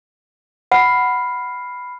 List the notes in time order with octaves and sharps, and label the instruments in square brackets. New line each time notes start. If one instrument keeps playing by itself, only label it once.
[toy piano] F#5 [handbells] B5 F6 C7